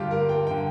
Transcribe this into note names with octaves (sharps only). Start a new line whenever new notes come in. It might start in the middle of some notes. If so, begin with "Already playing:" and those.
Already playing: G2 D3 F4 G4
A#4
G5
D3 G5